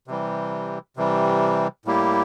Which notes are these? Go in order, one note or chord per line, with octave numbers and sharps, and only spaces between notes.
C3 E3 G3
C3 E3 G3
A2 G3 A#3 E4 G4